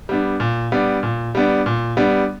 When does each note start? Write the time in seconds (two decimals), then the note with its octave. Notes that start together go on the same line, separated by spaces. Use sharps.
0.09 G3 B3 D4
0.40 A#2
0.72 G3 B3 D4
1.03 A#2
1.35 G3 B3 D4
1.66 A#2
1.97 G3 B3 D4